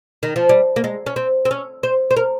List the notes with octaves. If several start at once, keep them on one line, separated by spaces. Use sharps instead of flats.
D#3
F3
G3
A#3
G#3
C#4
C4
C4
C#4
C5
C5
A#4